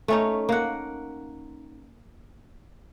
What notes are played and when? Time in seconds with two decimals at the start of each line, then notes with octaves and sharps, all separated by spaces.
0.08 A3 C#4 D#4
0.49 A#3 F#5